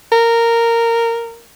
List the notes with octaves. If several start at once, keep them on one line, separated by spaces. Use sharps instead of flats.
A#4